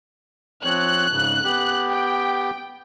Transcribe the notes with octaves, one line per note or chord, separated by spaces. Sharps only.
F3 C4 C#5 F#6
G#2 C#3
B3 G4
G5